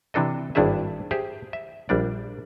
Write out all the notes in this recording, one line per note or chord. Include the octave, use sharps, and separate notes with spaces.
C3 E3 D4 A4 D#5
G#1 G2 D4 E4 G#4 E5
G4 G#4 C5 E5
E5
A#1 G3 D4 D5